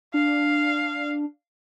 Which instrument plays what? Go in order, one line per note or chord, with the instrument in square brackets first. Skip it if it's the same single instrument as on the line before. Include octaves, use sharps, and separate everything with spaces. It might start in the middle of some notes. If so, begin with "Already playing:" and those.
[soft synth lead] D4 [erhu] F5